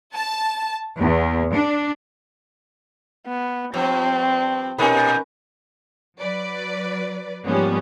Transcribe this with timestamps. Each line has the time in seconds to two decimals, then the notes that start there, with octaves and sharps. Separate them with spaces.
0.14 A5
0.98 E2
1.53 D4
3.27 B3
3.74 G2 F3 C4
4.78 A#2 C#4 D#4 A#4 B4
6.21 F#3 B4 D5
7.45 G#2 F3 G3 A#3 B3 C#4